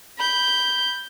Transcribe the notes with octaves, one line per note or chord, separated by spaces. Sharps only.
B5 G6